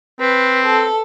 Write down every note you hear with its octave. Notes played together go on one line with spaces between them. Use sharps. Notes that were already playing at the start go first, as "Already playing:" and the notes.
C4 B4
A4